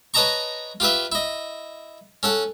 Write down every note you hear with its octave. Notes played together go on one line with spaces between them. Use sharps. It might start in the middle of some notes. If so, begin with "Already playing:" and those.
B4 C#5 D#5 A5 A#5 C#6
F4 G4 B4 E5
E4 D#5
C#4 A4 F#5